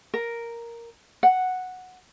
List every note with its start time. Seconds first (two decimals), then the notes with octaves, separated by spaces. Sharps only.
0.14 A#4
1.23 F#5